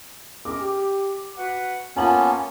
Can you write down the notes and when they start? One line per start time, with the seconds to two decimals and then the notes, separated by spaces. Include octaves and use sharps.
0.45 G#3 C#4 A#4 D6
0.60 G4
1.37 F#4 B4 F#5
1.96 A#3 B3 C#4 F4 G#5 A5 F#7